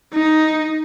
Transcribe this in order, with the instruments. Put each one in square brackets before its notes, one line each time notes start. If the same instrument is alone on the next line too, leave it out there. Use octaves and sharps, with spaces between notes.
[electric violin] D#4